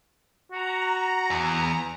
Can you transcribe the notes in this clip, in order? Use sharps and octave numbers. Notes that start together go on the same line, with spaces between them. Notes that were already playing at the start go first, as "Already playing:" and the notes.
F#4 A#5
E2